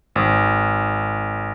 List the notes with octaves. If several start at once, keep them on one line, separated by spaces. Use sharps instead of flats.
G#1